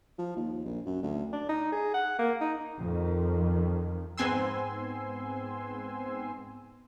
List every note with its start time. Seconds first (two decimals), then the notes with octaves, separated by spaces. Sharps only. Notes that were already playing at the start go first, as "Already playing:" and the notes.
0.18 F3
0.36 D#2
0.65 A#1
0.86 F#2
1.03 D2
1.33 D4
1.49 D#4
1.72 G#4
1.94 F#5
2.19 A#3
2.41 D#4
2.80 F2 D#3
4.17 G#2 B3 C4 G#5 C6 E6